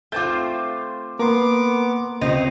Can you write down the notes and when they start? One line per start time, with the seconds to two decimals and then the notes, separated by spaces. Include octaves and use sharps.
0.12 A3 C4 F4 D6 G6
1.19 A#3 B3 A#4 C6 D6
2.21 C#2 C3 C5 D#5